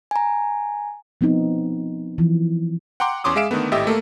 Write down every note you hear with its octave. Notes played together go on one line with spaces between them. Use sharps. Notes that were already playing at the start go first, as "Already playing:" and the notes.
G#5 A#5
F3 B3 C4 D#4
E3 F3
F#5 G5 A#5 C6 D6
E2 C#4 C6 D6 D#6
G#3 G#4 E5 F5 D7 E7
D3 D#3 A3 B3
G#1 A2 G4 D#5 E5
A3 A#3 A4